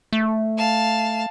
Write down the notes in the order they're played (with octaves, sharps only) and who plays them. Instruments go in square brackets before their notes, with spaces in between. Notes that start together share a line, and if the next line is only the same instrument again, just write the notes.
[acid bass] A3
[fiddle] F5 A5